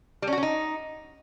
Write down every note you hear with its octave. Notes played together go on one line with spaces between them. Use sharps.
G3
C#4
F#4
C#4
D#4